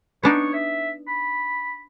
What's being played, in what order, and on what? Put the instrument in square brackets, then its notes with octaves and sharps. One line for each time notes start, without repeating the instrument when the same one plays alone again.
[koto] B3 D4 D#4 [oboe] C#5
[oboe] E5
B5